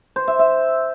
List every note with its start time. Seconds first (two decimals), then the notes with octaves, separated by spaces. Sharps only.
0.16 C5
0.28 E5
0.39 E5